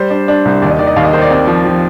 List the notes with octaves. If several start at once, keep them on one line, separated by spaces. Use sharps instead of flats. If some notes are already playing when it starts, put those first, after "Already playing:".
Already playing: G3 C5
D4
D4
C2
D#2 D5
D#5
D#3 D5
D#5
D#2 F5
D#5
D#3 C5
D5
C4
F3
F3